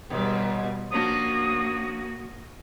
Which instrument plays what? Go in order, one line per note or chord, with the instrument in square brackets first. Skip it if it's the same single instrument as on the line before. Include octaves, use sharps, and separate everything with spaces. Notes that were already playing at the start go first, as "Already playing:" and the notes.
[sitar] D#2 G#2 [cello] B2 G3
[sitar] F3 C#4 D4 [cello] A#3 F#4 [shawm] D#6